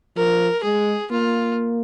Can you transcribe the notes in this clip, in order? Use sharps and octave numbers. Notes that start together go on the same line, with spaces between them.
F3 A#4
G#3 G#4
A#3 F4